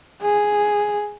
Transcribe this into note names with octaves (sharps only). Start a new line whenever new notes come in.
G#4